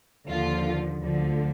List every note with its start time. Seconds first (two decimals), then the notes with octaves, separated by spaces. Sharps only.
0.29 D#2 D3 F3 F4
1.02 D2 D3 F3